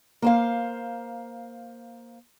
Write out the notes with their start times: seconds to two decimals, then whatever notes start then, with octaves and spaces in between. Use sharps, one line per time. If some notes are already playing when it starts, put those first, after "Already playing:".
0.22 A#3 C5 F5